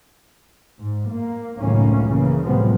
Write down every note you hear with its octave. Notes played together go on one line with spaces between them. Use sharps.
G#2
A#3
C#2 F#2 A2 D#3 A#3 C#4
C#3 E3 A#3
A2 C3 F3 F#3 G#3 B3